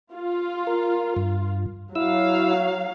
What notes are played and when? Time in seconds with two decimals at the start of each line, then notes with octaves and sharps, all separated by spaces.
0.13 F4
0.67 A#4
1.16 G2
1.95 F#3 E4 F5 E6